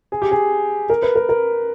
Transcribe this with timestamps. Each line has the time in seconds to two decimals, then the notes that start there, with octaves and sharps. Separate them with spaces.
0.12 G#4
0.22 G4
0.31 G#4
0.90 A#4
1.02 B4
1.16 A#4
1.29 A#4